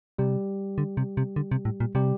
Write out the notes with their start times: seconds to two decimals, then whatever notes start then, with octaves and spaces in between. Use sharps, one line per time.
0.18 C3 G3 G4
0.78 D3
0.97 C3
1.17 C3
1.36 D3
1.51 C3
1.65 A2
1.80 A#2
1.95 C3 G3 G4